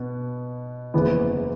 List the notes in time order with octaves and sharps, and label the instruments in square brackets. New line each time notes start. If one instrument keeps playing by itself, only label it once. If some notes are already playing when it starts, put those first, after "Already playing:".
Already playing: [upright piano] B2 B3
F#1 E2 E3 B3